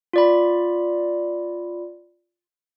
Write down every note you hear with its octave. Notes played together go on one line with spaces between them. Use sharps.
F4 D5 B5